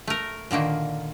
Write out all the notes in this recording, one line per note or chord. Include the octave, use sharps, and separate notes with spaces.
A3 A#4
A#2 D3 D#3 A#3